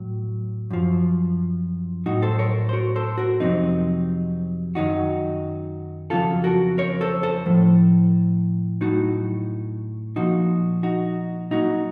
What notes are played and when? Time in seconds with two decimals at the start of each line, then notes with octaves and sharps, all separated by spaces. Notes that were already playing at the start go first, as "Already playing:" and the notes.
Already playing: A2 F#3
0.71 F#2 F3
2.06 A2 F#3 D#4 F#4
2.22 A4 C5
2.39 A#4 C#5
2.69 C5
2.73 F#4 A#4
2.96 A4 C5
3.18 F#4 A#4
3.40 F2 C3 F#3 C4 D#4
4.75 F#2 D#3 F#3 D#4 F#4
6.10 F2 C#3 F#3 F4 A4
6.44 F#4 A#4
6.78 A#4 C#5
7.01 A4 C5
7.23 A4 C5
7.46 A2 F3
8.81 A2 F#3 D#4 F#4
10.16 A#2 F3 D#4 F#4
10.83 D#4 F#4
11.51 A#2 F#3 D#4 F#4